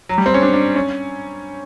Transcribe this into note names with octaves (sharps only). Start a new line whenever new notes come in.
F#3
G3
C4
C#4
D4
D4
C#4